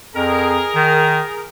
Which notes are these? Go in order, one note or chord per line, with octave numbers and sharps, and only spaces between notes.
F2 G#4 A#4
D#3